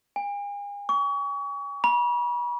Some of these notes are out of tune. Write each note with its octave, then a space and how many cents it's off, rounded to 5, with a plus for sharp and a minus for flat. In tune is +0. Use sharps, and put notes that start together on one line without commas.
G#5 -40
C#6 +35
B5 -40